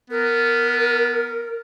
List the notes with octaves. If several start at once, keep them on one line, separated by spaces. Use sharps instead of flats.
B3 A#4